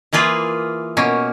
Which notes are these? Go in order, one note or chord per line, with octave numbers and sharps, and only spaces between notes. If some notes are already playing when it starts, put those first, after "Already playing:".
E3 A#3 F4 G#4 B4
B2 A#3 C#4